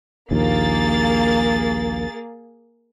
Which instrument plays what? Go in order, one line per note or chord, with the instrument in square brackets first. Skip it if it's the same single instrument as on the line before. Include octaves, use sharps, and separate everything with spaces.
[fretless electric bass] A#1 D#2 [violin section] A#3 G#4 A6